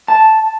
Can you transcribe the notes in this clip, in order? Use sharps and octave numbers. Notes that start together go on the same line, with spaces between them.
A5